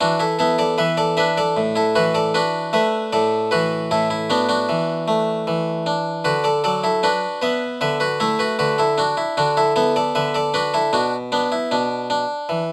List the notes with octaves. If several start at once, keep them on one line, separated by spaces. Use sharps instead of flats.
E3 D4 F#4
E4 A4
B3 E4 A4
A4 D5
E3 B4 E5
A4 D5
D4 B4 E5
A4 D5
A2
E4 A4
E3 F#4 B4
A4 D5
D4 F#4 B4
A3 B4 E5
A2 A4 D5
E3 F#4 B4
A2 E4 A4
E4
B3 D4 F#4
D4 F#4
E3
A3
E3
D4
D3 F#4 B4
A4 D5
F#3 A4 D5
E4 A4
D4 F#4 B4
B3 B4 E5
D3 B4 E5
F#4 B4
A3 E4 A4
F#4 B4
D3 F#4 B4
E4 A4
D4 F#4
E4
D3 D4 F#4
E4 A4
B3 E4 A4
A4 D5
D3 B4 E5
A4 D5
D4 F#4 B4
E4 A4
B2 D4 F#4
B3 D4
E4
B2 D4
D4
E3